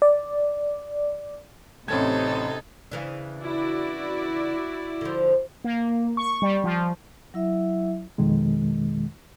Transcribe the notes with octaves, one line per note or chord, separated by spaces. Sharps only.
D5
A1 C3 C#4 D#4 A4 G#6
C#3 E3 D4
E4 F#4 D5
D3 F3
A#3
C#6
G3
F3
F#3 E4 E5
F2 B2 D#3 G#3